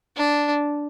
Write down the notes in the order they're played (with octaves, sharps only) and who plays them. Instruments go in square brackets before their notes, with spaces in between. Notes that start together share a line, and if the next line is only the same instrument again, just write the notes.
[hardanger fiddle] D4